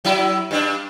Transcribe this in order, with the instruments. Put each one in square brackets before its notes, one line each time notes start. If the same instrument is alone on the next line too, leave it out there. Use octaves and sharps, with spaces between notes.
[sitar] F#3 E4
G2 D4